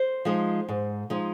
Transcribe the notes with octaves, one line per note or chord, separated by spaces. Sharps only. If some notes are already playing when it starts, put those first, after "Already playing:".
Already playing: C5
F3 G#3 D#4
G#2
F3 G#3 D#4